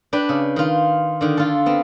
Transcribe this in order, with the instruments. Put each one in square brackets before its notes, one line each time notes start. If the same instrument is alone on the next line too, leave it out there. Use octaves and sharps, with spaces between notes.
[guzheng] D4 B4 G5
C#3
D#3 F4
D3 D#3
F4 A4
B3 C4